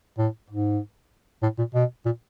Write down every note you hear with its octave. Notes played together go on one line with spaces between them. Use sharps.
A2
G#2
A2
A#2
B2
A#2